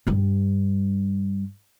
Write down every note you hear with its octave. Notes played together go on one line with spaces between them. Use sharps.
G2 G3